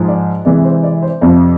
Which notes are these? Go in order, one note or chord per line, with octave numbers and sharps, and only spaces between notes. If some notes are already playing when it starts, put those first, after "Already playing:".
Already playing: G#2 F3 G#3
D5
C3 E3 G#3 D5
C5
D5
C5
F2 C3 F3 D5